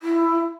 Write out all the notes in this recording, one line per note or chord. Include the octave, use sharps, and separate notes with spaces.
E4